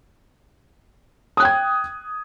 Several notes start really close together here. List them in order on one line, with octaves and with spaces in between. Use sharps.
D#6 F#6 G5 G#6